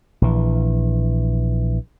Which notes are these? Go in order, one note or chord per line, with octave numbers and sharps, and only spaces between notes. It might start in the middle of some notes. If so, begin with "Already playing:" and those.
A#1 E3